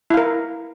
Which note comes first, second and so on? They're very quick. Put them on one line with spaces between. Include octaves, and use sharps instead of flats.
E4 F5 A#4